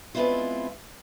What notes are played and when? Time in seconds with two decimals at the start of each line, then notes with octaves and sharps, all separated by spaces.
0.15 G#3 B3 C4 D4 E4 F4